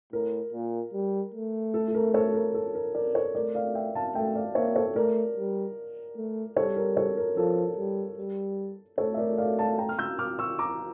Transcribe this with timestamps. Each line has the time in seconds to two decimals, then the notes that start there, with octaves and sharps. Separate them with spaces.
0.13 A2 A#4
0.53 A#2
0.93 G3
1.34 A3
1.74 A4
1.88 A4
1.94 A#4
2.14 A4 C#5
2.34 A#4
2.54 A4
2.75 A#4
2.94 A#4 D5
3.15 A4 C#5
3.35 A3 A#4 D5
3.55 D5 F5
3.75 E5 G5
3.95 F5 A5
4.15 A3 E5 G5
4.35 D5 F5
4.55 A#3 C#5 E5
4.76 A4 C#5
4.95 A3 A#4 D5
5.37 G3
6.16 A3
6.56 G3 A4 C#5
6.76 A#4
6.97 A4 C#5
7.17 A#4
7.37 F3 A4
7.77 G3
8.18 G3
8.98 A3 A4 C#5
9.14 E5
9.18 A#4 D5
9.38 D5 F5
9.58 F5 A5
9.78 G5 A#5
9.89 F6
9.98 E6 G6
10.19 D6 F6
10.39 C#6 E6
10.59 A#5 D6